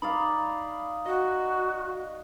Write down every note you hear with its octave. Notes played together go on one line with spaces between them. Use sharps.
D#4 D5 F5 B5
F#4 D#5